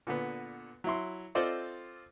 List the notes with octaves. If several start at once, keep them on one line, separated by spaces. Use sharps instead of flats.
A#2 D3 B3
F#3 E4 C6
C4 F4 A4 C5 D5 D#5